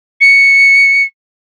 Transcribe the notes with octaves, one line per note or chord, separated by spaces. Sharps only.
C#7